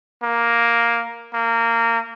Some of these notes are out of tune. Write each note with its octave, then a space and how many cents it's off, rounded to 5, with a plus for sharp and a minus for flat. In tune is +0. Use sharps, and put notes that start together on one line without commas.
A#3 +5
A#3 -20